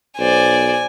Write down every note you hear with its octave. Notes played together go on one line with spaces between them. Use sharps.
B1 C5 D5 G#5